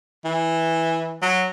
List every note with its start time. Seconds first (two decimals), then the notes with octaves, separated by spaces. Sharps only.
0.25 E3
1.22 F#3